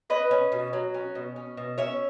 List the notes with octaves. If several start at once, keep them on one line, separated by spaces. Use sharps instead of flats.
C#4 B4 D#5
C#4
B2
F#3
C#4
B2
C#4
B2
C#4 C#5 E5